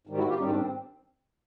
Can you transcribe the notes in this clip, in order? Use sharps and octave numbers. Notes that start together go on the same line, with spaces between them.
G#2 D#3 G3
E4 F#4
F4 G4
G#2 D#3 G3 C#4 D#4
C4 D4
C4